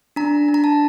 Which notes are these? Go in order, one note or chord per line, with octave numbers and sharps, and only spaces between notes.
D4 A#5
D4
A#5
A5